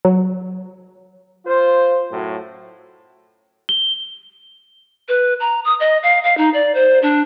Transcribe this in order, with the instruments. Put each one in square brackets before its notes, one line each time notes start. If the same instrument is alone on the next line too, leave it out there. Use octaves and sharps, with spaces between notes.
[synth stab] F#3
[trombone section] F4 C5
F#2 A2 F#3
[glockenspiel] G7
[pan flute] B4
A#5
D#6
D#5
F5
F5
D#4
D5
C5
D4